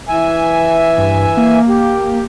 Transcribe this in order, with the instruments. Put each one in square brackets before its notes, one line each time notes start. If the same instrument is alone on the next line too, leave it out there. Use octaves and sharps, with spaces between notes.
[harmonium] E3 E5 G#5
[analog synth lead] G2
A#3
[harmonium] G4